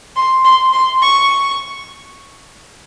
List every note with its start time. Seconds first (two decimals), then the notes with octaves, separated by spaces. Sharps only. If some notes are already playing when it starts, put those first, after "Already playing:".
0.16 C6
0.45 C6
0.73 C6
1.02 C#6